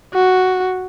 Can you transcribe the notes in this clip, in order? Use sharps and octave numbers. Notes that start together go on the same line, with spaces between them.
F#4